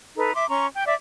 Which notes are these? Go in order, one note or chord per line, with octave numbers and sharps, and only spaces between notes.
D#4 A4 B4
E5 C6 D6
C#4 A#5 C6 C#6
G5
D5 E5 D6